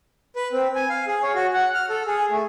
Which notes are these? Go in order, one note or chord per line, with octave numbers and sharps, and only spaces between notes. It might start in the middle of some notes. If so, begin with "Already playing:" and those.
B4
C4
G#5
F5
G#4
C#5
F#4
F#5
F6
A4
G#4
A3